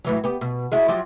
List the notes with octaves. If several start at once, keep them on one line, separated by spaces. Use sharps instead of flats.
A2 E3 F#3
B3 G4
B2
G#3 E4 F#4
F3 F#3 G4